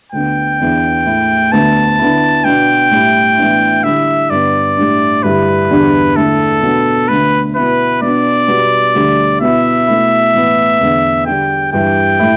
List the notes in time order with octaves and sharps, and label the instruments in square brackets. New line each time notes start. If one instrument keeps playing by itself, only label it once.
[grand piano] D2 D3 B3 [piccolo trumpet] G5
[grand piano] E2 E3 B3 D4
A2 A3 E4
[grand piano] D2 D3 B3 [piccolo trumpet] A5
[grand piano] D3 B3 E4
[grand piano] B2 B3 D4 [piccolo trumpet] G5
[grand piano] A2 G3 E4
A2 E3 B3 D4
[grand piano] D3 G3 E4 [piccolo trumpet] E5
[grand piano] G2 D3 B3 [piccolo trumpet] D5
[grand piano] A2 G3 D4
[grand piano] G2 D3 G3 E4 [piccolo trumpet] B4
[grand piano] E2 D3 G3 D4
[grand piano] D3 A3 E4 [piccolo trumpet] A4
[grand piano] B2 B3 D4
[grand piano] D2 D3 A3 [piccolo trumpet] B4
[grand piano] B2 B3 E4 [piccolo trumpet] B4
[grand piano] B2 B3 D4 [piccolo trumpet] D5
[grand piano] B2 G3 B3
D2 D3 G3
[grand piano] B2 B3 E4 [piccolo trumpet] E5
[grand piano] B2 A3 E4
A2 E3 B3
E2 D3 B3
[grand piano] D3 G3 D4 [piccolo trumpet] G5
[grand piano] G2 E3 G3 D4 [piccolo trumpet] G5
[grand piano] A2 A3 E4